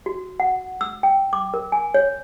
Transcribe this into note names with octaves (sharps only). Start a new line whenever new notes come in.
F#4
F#5
E6
G5
D6
A#4
G#5
C#5